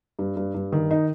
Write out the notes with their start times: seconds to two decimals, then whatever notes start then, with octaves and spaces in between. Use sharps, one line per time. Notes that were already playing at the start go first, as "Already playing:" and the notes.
0.19 G2
0.37 G2
0.54 G2
0.72 D#3
0.91 D#4